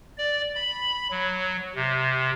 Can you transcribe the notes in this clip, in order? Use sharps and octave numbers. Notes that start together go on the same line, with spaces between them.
D5
B5
F#3
C3